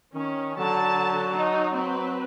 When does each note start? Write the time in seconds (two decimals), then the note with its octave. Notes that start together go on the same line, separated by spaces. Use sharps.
0.14 D#3 C#4
0.58 D3 F#3 A5
1.36 D#4
1.75 C4 B4